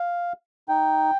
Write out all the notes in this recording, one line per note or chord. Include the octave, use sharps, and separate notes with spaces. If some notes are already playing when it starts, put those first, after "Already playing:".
Already playing: F5
D#4 G5